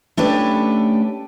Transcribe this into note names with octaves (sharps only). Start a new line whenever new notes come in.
A3 C#4 D4 G4 A4 B4